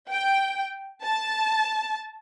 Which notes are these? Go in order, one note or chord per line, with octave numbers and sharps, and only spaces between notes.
G5
A5